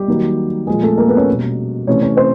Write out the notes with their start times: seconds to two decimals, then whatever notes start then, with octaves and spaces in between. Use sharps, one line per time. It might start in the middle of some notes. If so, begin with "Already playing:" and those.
Already playing: G3 G4
0.08 D#3 F#3 A#3
0.67 A#2 F3 G#3 A#3 G#4
0.83 A3 A4
0.97 A#3 A#4
1.08 B3 B4
1.17 C#4 C#5
1.28 B2 G3 A#3
1.87 C3 E3 A3 C#4 C#5
2.02 C#4 C#5
2.17 C4 C5